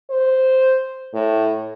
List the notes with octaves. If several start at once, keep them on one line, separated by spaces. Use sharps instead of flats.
C5
A2